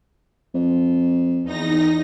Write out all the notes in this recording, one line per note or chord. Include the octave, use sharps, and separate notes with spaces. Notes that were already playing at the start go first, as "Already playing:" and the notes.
F2
E2 D#4 A#6